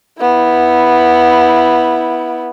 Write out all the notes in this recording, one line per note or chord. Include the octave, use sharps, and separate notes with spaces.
B3 E4